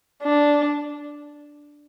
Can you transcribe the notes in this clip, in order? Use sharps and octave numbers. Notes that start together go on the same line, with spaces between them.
D4